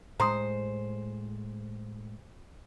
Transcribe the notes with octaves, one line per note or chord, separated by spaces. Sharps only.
A2 G#3 C5 A#5 C6 D#6